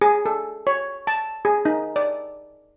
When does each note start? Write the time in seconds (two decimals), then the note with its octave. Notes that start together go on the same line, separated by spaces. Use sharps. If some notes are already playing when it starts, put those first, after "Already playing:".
0.01 G#4
0.26 A4
0.67 C#5
1.07 A5
1.45 G#4
1.65 D#4
1.96 D5